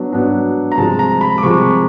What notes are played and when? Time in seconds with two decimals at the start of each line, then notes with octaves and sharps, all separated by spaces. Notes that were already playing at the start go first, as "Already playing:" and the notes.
Already playing: F#3 B3 D4
0.13 F#3 B3 D4
0.72 A#5
0.77 C3 F3 G#3 A5
0.99 A#5
1.21 B5
1.38 D6
1.43 C3 F3 G#3 C#6